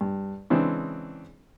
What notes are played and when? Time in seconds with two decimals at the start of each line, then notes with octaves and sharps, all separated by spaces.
0.01 G2
0.50 C#3 E3 G#3 C4 D4